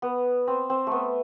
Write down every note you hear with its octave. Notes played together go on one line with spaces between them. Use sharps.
B3
C4
C4
A3 B3